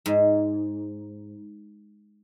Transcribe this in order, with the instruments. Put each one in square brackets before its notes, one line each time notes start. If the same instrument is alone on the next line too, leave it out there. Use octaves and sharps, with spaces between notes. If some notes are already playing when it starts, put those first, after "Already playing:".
[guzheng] G#2